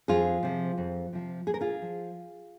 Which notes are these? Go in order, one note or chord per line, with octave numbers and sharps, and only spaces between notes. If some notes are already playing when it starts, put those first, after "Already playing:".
F2 F4 G#4
C3 F3
F2
C3 F3
A#2 G#4
A#4
F4 G#4
F3